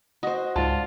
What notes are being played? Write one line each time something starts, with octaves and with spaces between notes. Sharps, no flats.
F#4 C5 D#5
C#2 G#2 F4 D5 A5